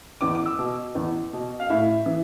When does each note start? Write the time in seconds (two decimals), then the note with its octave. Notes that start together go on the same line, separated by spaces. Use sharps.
0.21 E2 D6
0.35 D6
0.46 E6
0.59 B2
0.95 E2
1.33 B2
1.60 F5
1.70 A2 E5
2.06 E3